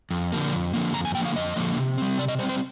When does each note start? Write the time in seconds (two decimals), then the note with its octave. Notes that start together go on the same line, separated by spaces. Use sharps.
0.11 F2
0.32 D3 F3 A#3
0.52 F2
0.74 D3 F3 A#3
0.94 F2 A#5
1.05 G#5
1.15 D3 F3 A#3 G5
1.25 F5
1.36 F2 D#5
1.56 D3 F3 A#3
1.77 C3
1.98 G3 C4
2.18 C3 D5
2.28 D#5
2.39 G3 C5
2.43 C4
2.49 C5